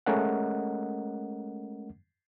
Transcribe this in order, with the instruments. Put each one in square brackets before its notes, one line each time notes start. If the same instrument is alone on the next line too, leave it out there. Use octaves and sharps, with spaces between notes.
[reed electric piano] G#3 A3 C#4 A#4 D#5 F#5